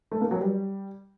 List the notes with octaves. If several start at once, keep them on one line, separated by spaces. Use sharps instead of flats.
A3
A#3
F#3
G3